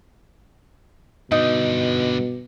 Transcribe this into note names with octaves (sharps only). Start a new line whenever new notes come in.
G2 B2 D3 D#4